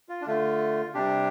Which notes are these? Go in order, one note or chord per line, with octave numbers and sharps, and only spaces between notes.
F4
D4
D3 A3 F4
C3 G3 D4 G4